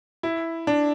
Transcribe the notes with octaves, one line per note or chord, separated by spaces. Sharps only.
E4
D4